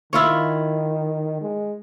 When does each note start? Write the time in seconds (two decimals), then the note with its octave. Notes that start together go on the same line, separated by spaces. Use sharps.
0.13 D#3 E4 F4 C#5
1.41 G#3